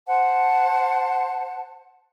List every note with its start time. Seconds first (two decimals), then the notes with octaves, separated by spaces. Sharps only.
0.07 C5 F#5 A5